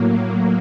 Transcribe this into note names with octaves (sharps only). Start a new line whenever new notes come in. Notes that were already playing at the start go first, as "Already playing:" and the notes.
Already playing: A2 F#3 A#3